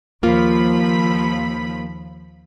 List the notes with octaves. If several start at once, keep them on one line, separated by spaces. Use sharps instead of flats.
D#2 F3 A#3 F4 B5